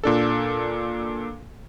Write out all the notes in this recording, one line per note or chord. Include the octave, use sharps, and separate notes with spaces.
A#2 D4 A4